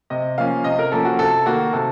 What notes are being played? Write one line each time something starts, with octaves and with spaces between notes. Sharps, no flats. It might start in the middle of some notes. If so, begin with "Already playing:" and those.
C3 D#5
F3 A#3 C#4 F5
C3 D#5
A#4
F3 A#3 C#4 A4
F#4
C3 A4
D#3 A#3 F#4
C3 A4